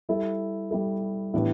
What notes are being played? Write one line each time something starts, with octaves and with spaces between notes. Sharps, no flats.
G3 E4 A4
G3 E4 A4
A2 E3 B3 D4 G4